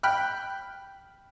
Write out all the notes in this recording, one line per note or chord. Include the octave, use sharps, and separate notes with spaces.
G5 B5 F6 F#6